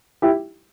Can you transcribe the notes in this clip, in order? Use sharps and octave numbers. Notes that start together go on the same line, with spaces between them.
E4 G4